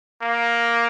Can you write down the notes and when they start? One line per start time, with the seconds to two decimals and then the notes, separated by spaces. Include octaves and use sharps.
0.22 A#3